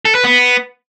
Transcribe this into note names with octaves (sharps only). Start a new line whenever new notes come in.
A4
B4
B3